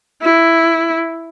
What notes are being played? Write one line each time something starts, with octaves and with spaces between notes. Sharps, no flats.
E4